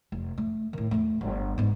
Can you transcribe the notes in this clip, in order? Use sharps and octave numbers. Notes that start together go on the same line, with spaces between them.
F1
A3
A2 D#3
E2 A3
G1
G#2 B3